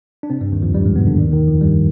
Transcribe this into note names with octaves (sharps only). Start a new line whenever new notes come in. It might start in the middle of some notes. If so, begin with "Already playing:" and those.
D4
C3 C4
G2 G3
D#2 D#3
F2 F3
G2 G3
G#2 G#3
B2 B3
D3 D4
D#2 D#3
D#2 D#3
F2 F3
G2 G3